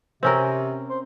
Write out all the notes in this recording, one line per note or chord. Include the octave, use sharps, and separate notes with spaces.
C3 C4 C#4 A#4
C5